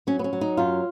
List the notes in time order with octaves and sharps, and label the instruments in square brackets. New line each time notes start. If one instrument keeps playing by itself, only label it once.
[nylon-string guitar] F#3 C#4
B3
C#4
F#3
D#4
F#2 F4